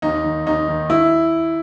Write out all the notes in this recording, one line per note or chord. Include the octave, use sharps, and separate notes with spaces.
D#2 D#4
D#3
D#2 D#4
D#3
E4